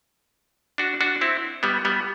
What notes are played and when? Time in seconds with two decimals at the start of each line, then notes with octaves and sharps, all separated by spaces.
0.78 D4 F#4
1.01 D4 F#4
1.21 C4 E4
1.63 G3 B3
1.85 G3 B3